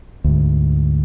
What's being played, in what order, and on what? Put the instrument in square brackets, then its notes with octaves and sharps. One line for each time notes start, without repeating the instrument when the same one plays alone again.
[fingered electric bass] D2 G#2